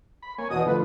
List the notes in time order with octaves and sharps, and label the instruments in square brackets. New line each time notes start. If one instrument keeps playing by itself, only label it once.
[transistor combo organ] B5
A#3 C#5 G#5
[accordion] E2 B2 D#6 [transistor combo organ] F#4 D#5
[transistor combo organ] D3 F3 A3 [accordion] B4